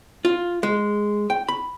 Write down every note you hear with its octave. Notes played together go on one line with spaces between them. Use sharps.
F4
G#3
G5
B5